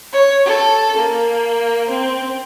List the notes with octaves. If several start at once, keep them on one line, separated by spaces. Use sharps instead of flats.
C#5
A4
A#3
C4